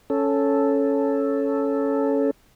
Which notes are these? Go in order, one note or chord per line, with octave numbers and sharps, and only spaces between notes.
C#4 A4